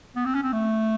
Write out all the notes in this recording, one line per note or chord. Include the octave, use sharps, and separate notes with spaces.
B3
C4
C#4
C4
A3